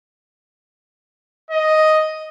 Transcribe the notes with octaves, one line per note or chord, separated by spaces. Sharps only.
D#5